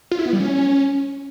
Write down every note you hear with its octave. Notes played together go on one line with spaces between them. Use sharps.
F4
E4
B3
G3
C#4